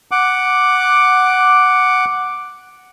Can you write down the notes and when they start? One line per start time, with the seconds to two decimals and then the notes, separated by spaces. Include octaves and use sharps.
0.11 F#5 D6